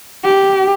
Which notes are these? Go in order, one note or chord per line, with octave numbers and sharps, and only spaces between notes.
G4